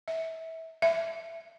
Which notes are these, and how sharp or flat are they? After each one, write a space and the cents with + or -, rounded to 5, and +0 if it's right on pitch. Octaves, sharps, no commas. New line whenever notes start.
E5 -25
E5 +5